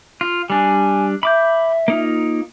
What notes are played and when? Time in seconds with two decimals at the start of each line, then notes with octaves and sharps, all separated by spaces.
0.21 F4
0.50 G3 D4 G#5
1.23 E5 B5 D6 G6
1.88 A#3 D#4 F4